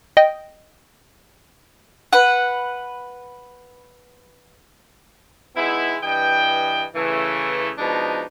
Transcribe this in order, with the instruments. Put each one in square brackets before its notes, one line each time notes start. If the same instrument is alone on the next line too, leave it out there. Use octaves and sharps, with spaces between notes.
[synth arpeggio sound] D#5 G5
[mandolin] B4 F#5
[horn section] G#3 B3 D#4 E4
G2 E3 D#5 G5
C#3 E3 A3
B2 F3 G#3 D4 D#4